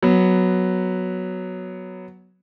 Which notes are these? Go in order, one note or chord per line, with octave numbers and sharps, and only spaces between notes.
F#3 B3